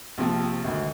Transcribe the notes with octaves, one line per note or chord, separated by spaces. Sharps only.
A#1 C3 F3
G#1 D2